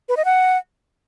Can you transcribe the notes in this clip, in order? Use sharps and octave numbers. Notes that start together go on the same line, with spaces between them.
B4
D#5
F#5